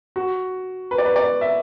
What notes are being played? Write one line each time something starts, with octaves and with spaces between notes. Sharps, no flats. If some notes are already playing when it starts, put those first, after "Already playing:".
F#4
B4
D5
B4
D5
E5